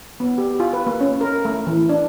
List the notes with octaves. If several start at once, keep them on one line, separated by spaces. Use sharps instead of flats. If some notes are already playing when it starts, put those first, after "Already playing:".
B3
G4
F4
B4
A#3
C#4
A#4
A3
E3
D4